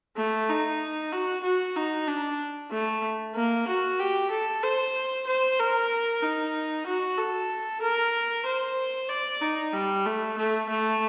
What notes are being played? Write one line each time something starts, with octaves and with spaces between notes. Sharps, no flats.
A3
D#4
F#4
F#4
D#4
D4
A3
A#3
F#4
G4
A4
C5
C5
A#4
D#4
F#4
A4
A#4
C5
D5
D#4
G3
A3
A3
A3